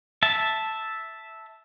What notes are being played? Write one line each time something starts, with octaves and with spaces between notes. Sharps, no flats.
E5 A5